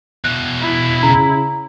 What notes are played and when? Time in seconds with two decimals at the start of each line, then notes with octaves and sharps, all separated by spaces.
0.24 E2 B2 F#6
0.62 E4
1.03 C#3 A#5